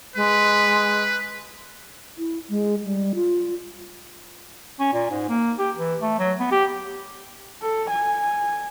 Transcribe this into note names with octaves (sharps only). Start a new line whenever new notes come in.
G#3 B4
E4
G#3
G3
F4
C#4
A#2
G#2
A#3
G4
E3
A3
F#3
B3
G4
A4
G#5